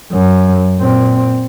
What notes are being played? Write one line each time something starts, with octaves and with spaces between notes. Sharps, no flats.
F#2
A#2 C4